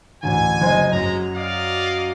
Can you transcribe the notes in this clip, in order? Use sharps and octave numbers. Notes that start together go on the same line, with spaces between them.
A1 D2 G#5
F#1 C5 D#5
F#2 G#3 A#5
D5 D#5 F5